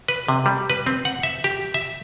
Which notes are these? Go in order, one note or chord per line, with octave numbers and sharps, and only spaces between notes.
B4
C3
G3
B4
C4
F#5
E5
G4
E5